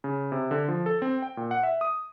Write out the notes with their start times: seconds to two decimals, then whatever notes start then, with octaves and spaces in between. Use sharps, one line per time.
0.04 C#3
0.32 C3
0.51 D3
0.68 F3
0.86 A4
1.02 C4
1.22 G5
1.37 A#2
1.51 F#5
1.63 E5
1.81 D#6